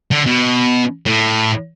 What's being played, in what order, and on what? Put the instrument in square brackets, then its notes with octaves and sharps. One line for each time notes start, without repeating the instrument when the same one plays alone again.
[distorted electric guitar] D3
B2
A2